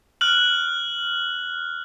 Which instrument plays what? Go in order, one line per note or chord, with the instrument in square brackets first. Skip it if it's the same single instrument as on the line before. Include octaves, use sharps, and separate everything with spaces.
[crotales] F6 F#6 F#7